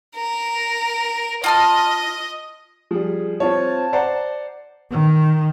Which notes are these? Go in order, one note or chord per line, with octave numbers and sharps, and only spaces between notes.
A#4
F4 D#5 A5 F6
F3 G3 G#4
C4 F4 C#5 A5
C5 D5 F#5 A#5
D#3